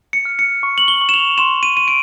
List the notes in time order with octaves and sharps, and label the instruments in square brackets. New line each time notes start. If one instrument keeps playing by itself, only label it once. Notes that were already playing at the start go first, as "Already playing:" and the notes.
[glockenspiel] C#7
F6
C#7
C#6
F#7
G7
C#6
E7
F7
C6 E7
D#7
C6 D#7
D7